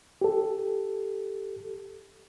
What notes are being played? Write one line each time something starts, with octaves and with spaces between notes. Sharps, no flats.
G4 A4